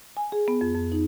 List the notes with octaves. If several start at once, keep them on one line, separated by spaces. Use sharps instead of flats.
G#5
G#4
B3
F2
F2
D#4